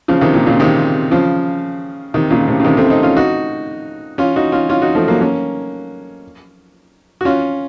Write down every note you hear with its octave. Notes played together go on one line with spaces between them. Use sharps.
C#3 F3
C3 D#3
A#2
A#2 C#3
C3 D#3
C#3 F3
C3 D#3
A#2 C#3
A2 C3
C#3
C3 D#3
A3 C4
C4 D#4
C#4 F4
D#4 F#4
C#4 F4
D#4 F#4
C#4 F4
C#4 F4
D#4 F#4
F3 A3
F#3 A#3
A#3 C#4
F#4
C#4 F4